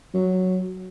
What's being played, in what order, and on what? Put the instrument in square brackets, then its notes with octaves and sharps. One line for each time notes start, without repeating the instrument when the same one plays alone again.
[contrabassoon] F#3